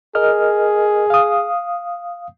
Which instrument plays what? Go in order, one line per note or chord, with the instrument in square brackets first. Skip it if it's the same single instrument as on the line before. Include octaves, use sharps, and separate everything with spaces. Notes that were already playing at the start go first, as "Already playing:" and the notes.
[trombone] G#4 [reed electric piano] A#4 D#5 F6
[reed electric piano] F5 D#6